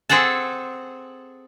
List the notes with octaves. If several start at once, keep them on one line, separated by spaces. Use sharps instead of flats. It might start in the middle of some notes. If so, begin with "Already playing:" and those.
C4 G#4 A4 F#5 A5